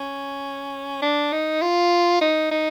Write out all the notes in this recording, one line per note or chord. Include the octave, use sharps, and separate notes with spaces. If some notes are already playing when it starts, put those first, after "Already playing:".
Already playing: C#4
D4
D#4
F4
D#4
D#4